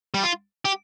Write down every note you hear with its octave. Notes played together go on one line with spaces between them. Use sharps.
G3
F4
G4